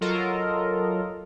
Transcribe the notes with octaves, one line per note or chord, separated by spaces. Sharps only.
F#3 F4 A4 A#4 D#5